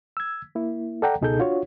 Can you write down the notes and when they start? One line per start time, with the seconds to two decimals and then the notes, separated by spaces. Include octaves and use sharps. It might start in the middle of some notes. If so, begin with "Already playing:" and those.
0.17 E6 G#6
0.55 A#3 E4
1.02 A4 D5 F#5 G5 A#5
1.21 C#2 B2 D#4 G#4 A4 G6
1.39 D4 F4 F#4 C#5